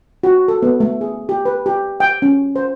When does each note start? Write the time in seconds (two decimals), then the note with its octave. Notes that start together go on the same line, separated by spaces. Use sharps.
0.23 F#4
0.48 A4
0.62 B3
0.80 A3
1.01 G#4
1.29 G4
1.45 B4
1.66 G4
2.00 G5
2.22 C#4
2.56 C5